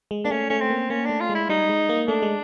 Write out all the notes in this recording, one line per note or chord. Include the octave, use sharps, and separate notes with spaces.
G#3
A#3 D4
A3 C#4
A3 C#4
C4
A#3
A#3 C#4
A3 D4
F4
G#3
E4
G3 D#4
G#3
A#3
A3 D4
G#3